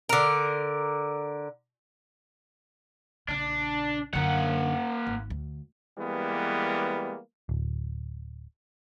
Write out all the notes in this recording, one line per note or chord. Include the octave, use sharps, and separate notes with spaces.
D3 A#4
A#1 C#3 D4
F#2 D3 A#3 F#5
G#1
D2
E3 G3 G#3 A#3 B3
D1